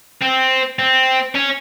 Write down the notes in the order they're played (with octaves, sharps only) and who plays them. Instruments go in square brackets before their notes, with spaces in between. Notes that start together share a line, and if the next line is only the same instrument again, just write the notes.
[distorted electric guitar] C4
C4
C#4